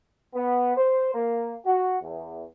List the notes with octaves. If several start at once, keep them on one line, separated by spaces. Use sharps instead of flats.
B3
C5
A#3
F#4
E2